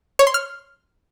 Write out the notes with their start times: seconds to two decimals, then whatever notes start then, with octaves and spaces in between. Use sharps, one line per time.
0.19 C#5
0.27 C6
0.34 F6